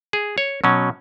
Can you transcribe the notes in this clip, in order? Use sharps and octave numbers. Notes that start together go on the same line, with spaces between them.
G#4
C#5
B2 F#3 C#4